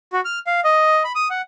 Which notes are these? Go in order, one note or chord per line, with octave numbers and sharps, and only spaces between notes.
F#4
F6
F5
D#5
B5
D#6
F#5